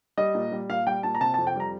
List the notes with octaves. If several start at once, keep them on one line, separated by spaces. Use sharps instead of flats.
G3 D#5
A#2
G3
A#2 F5
G3 G5
A#2 A5
A#5
C3 A5
A5
F2
G5
G3 A#5